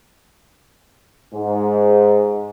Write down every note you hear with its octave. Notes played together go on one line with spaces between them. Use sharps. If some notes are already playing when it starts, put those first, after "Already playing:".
G#2